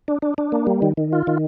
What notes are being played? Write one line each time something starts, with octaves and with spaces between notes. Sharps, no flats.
D4
D4
D4
A#3
G3
D#3
D#3
F4
D#3